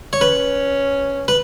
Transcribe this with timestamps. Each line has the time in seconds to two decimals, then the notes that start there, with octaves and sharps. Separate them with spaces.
0.13 C#5
0.21 C#4 B4
1.28 B4